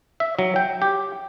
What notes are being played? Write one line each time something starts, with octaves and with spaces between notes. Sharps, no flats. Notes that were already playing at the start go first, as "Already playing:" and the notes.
E5
F#3
G5
G4